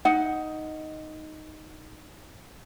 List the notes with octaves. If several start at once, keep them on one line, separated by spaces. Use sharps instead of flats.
D#4 F#5